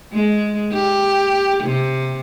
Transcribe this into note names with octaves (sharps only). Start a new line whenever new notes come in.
G#3
G4
C3